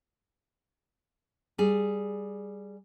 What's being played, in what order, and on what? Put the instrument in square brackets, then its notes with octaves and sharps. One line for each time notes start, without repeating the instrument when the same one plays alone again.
[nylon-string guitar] G3 G#4